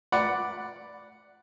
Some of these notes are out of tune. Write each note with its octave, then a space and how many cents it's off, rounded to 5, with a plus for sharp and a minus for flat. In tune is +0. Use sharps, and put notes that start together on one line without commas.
D5 +0 F#5 +0 B5 +0